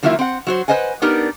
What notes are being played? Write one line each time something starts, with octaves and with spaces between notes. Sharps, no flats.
D#3 F#3 A#3 E4 F4 E5
C4 F#5
F#3 F#4 C5
B4 C5 D#5 F#5 G#5
B3 D4 D#4 G4 A#4